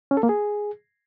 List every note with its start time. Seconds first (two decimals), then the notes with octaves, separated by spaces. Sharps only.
0.11 C#4
0.17 A4
0.23 A#3
0.29 G#4